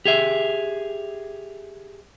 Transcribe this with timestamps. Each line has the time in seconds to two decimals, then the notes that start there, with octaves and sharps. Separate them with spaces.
0.05 G4 G#4 E5